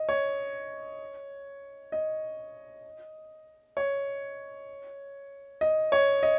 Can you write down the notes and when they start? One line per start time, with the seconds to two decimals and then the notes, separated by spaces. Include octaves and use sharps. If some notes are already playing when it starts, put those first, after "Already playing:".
Already playing: D#5
0.09 C#5
1.92 D#5
3.77 C#5
5.61 D#5
5.92 C#5
6.23 D#5